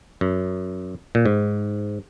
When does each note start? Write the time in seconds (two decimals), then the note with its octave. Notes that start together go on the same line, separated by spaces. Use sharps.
0.21 F#2
1.15 A#2
1.26 G#2